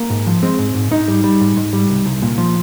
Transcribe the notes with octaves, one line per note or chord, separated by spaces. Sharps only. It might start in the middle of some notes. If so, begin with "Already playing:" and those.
Already playing: A#3
G#2
F3
G#3 C4
G#2
G#2
G#2 D#4
G3
G3
G#2
G#2
G3
C2
C2
A#2
F3